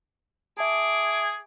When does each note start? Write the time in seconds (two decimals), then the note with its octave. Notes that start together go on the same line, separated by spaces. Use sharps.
0.58 G#4 E5 A5 D6